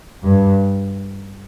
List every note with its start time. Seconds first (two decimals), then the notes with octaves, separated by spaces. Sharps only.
0.23 G2